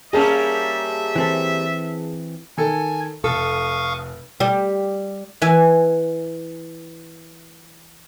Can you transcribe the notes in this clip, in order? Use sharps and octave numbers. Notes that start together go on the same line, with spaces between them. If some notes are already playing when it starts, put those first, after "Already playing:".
G3 A#3 C#4 G#4 E5 A5
E3 C4 A4
D#3 A4 G#5
F1 A4 F5 C#6 D#6
G3 G4
E3 E5 G#5